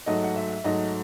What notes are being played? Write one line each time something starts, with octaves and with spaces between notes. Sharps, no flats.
G#2 F#3 A3 D#5
F#5
E5
G#2 F#3 A3 D#5